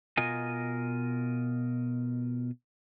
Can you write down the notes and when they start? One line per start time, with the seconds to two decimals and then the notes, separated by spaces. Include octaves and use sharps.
0.17 B2 F4 A#4 D#5 G#5